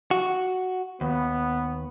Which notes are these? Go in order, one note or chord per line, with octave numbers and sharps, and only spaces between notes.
F#4
D#2 B3